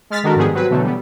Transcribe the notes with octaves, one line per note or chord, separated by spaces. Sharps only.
G#3 F6 A6 B6
D#3 G#3 D4 F#4 A4 A#4
G#2 D#3 F3 G3 B3 G#4
F#3 C4 B4
B2 D3 E3 F#3 A3
G3 B3